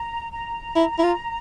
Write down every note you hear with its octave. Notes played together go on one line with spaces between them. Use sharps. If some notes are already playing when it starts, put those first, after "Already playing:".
Already playing: A#5
A#5
E4
E4
F4